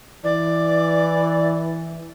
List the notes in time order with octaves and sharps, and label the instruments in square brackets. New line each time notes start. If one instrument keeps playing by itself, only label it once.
[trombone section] E3 [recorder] D5